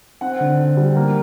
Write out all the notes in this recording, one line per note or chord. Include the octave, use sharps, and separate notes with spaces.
C4 F#5
D3
D3
G3
A#3